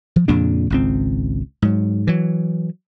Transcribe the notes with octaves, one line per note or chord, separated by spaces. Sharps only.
F3
F2 A#2 C#3 D4
G#1 C#2 C4
G#2 F#3
E3 F#3